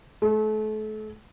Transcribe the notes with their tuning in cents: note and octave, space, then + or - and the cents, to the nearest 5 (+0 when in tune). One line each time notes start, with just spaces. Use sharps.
A3 -35